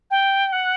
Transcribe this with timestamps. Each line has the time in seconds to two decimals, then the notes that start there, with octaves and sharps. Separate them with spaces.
0.11 G5
0.52 F#5